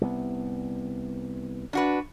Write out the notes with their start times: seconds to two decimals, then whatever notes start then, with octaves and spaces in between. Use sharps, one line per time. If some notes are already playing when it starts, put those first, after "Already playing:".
0.01 C2 B3
1.73 D4 F#4 B4